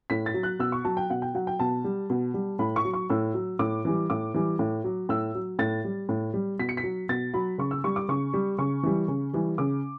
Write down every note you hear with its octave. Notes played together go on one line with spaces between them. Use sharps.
A2 B6
A6
F#3
F#6
B2 E6
C#6
F#3 A5
G5
B2 F#5
G5
F#3 F#5
G5
B2 A5
G3
B2
G3
A2 B5
C#6
F#3
C#6
A2 E6
F#3
A2 D6
E3 G3
A2 D6
E3 G3
A2
F#3
A2 E6
F#3
A2 A6
G3
A2
G3
B2 B6
C#7
B6
F#3
B2 A6
F#3 B5
C#3 C#6
E6
G3 C#6
D6
C#3 C#6
G3
C#3 C#6
E3 G3
C#3
E3 G3
C#3 D6